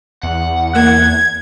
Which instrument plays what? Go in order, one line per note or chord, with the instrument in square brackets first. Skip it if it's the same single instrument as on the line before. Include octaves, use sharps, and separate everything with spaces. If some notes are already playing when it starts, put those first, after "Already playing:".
[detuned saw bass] E2 [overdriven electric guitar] F#5
[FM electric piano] A#3 F#6 [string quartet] G#6